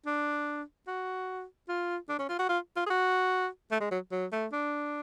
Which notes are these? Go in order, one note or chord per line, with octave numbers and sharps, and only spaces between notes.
D4
F#4
F4
D4
C#4
F4
F#4
F4
F4
G#4
F#4
A3
G#3
F#3
F#3
A3
D4